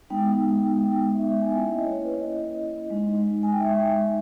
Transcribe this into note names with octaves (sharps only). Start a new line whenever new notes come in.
G#3 B3 D#4 G5
E5
G#5
A#3 C#4 E4 G5
E5
D#5
C#5
B4
C#5
D#5
G#3 D#4
G#5
G5
E5